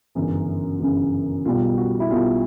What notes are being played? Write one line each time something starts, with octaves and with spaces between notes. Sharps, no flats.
G1 F#2 C#3 E3
G1 F#2 C#3 E3
B1 B2 G3 F4
F#4
E4
B1 B2 G3 F4